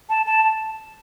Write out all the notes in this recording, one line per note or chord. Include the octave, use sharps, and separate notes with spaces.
A5
A5
A5